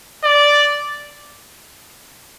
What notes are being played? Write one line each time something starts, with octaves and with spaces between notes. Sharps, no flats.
D5